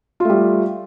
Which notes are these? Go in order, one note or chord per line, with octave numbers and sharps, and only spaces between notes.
G3 A3 F4